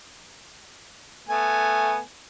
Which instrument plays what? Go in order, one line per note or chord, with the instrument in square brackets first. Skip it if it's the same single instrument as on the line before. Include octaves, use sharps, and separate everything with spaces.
[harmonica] A3 B3 G#5